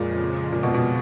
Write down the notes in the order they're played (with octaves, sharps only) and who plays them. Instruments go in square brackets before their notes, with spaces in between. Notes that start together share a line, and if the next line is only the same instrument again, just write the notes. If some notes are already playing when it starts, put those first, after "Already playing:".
Already playing: [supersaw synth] F2 C#3 F3 G#3 [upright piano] A#2
[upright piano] A#2
B2
B2